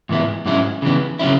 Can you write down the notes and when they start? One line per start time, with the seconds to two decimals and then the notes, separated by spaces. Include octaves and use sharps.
0.09 G#2 E3 B3 E4
0.46 G#2 F#3 C#4 E4
0.82 C#3 E3 B3
1.19 C#3 F#3 C#4 E4